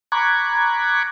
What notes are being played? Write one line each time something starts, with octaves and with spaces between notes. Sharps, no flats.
A#5 B5 C#6 D6 F#6 G#6